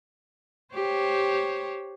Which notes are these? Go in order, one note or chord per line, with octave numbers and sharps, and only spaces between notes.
G4 C5 C#5